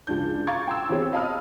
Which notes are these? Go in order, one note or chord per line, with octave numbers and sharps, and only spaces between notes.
C#2 F3 D4 G6
F5 A#5 C#6 D6 G#6 A6
G5 C6 E6
E3 B3 C4 G4 G#4 C#5
D#5 F5 A5 B5 D#6 F6